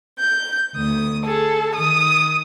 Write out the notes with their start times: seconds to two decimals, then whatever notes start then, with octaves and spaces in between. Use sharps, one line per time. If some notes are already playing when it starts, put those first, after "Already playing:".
0.19 G6
0.75 D2 D#6
1.25 G#4 A4
1.76 D#3 D#6